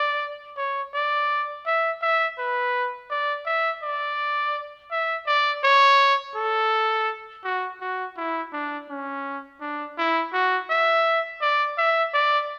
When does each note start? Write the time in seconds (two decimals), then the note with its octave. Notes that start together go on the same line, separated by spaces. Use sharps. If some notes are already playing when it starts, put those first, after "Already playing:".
Already playing: D5
0.57 C#5
0.94 D5
1.67 E5
2.02 E5
2.39 B4
3.10 D5
3.46 E5
3.83 D5
4.92 E5
5.27 D5
5.64 C#5
6.36 A4
7.45 F#4
7.81 F#4
8.17 E4
8.53 D4
8.89 C#4
9.62 D4
9.98 E4
10.33 F#4
10.70 E5
11.41 D5
11.78 E5
12.14 D5